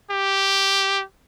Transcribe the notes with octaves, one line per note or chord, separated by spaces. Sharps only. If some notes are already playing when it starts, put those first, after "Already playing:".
G4